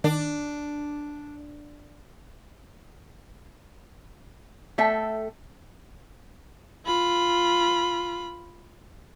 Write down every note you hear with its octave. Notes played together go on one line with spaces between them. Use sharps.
D#3 D4
A3 A4 E5 G5
F4 B5